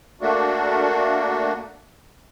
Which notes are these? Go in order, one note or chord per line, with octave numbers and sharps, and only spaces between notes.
A3 A#3 D4 F#4